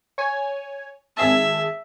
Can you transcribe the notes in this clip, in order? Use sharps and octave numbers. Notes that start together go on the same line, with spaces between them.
C#5 G#5
G#1 G#4 E5 A5